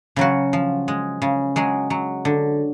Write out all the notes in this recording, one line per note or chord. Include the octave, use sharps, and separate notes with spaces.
C#3 F#3 F#4
F3
G#3
C#3
F#3 G#3 G#4
F#3
D3